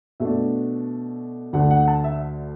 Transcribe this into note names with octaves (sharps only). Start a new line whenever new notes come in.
B2 A3 D4 E5
D2 D3 A3 D4 F#5
F#5
A5
E5